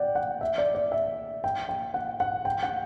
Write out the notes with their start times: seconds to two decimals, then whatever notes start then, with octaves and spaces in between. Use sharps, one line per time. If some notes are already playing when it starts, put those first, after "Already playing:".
Already playing: D5 F#5 G5
0.15 F#5
0.41 E5
0.58 D5
0.75 D5
0.92 E5
1.44 G5
1.69 G5
1.94 F#5
2.20 F#5
2.45 G5
2.63 F#5